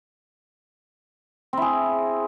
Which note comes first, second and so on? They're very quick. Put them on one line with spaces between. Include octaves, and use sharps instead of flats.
C4 E4 G#4